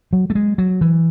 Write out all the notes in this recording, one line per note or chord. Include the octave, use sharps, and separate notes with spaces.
F#3
A3
G#3
F#3
E3